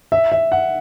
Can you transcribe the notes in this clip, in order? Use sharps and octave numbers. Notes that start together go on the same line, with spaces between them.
E5
E5
F#5